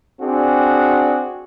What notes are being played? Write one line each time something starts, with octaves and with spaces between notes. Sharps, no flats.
C4 D4 F#4 G#4